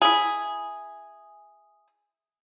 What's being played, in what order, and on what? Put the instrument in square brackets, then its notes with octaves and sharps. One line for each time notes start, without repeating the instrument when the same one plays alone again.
[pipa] E4 G#4